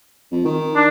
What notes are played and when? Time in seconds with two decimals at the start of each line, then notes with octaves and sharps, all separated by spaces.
0.32 F2
0.45 D#3
0.76 D4